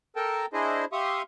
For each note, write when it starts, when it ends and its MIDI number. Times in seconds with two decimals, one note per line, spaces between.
0.16 0.46 69
0.16 0.46 70
0.16 0.46 79
0.16 0.46 81
0.53 0.85 62
0.53 0.85 64
0.53 0.85 68
0.53 0.85 72
0.53 0.85 75
0.93 1.22 67
0.93 1.22 76
0.93 1.22 77
0.93 1.22 84
0.93 1.22 85
0.93 1.22 87